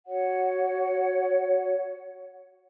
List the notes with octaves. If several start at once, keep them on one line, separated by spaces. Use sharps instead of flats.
F#4 C#5 F#5